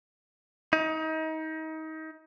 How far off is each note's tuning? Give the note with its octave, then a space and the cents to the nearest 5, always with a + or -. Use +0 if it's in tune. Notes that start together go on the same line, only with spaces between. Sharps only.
D#4 +30